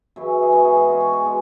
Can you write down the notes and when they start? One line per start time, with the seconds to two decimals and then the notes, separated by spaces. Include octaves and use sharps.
0.16 F#2 C#3 E3 E4
0.42 G#4
0.52 G#2 E3 B3 F#4
0.65 G#4
0.77 G#4
0.89 G#2 G#3 C#4 F#4
1.01 F#4
1.13 G#4
1.25 B2 G#3